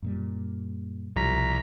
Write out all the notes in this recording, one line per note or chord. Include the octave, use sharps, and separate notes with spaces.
F#2 A#2 G3
C2 B2 F3 A#5 B6